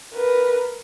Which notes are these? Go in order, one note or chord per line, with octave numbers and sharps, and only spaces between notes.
A#4 B4